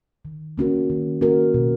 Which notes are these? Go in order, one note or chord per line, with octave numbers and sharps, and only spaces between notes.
D#3
A#3 C#4 F#4 A#4
D#3
A#3 C#4 F#4 A#4
B2